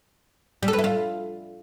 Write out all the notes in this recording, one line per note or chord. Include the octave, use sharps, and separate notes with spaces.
G3
A4
B4
E4
F4